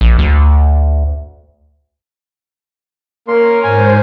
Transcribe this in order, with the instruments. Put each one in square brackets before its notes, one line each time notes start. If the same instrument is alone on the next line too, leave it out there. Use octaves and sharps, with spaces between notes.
[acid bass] A#1
D2
[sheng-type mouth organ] A#3 C6 [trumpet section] C#4 A#4
[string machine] G#2 C5 [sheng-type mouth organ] G#5